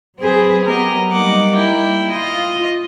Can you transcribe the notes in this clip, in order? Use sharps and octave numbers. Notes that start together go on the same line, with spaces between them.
F#3 C4 G#4 B4
F#3 B3 G4 A#4 D#5
G3 A#3 D#4 F#5 D6
E4 G5
F4 D#5